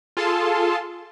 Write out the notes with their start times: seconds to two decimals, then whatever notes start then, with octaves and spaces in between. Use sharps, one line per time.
0.17 F4 G#4 A4 A5 C6